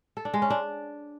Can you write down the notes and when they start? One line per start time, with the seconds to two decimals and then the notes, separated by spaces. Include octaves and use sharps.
0.17 A4
0.25 D4
0.34 G#3
0.42 C#4
0.50 D4